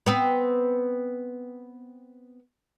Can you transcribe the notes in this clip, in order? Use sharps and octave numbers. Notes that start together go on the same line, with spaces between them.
B3 C4 B4